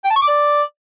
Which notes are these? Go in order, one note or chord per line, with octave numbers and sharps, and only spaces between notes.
G5
A5
C#6
D6
D5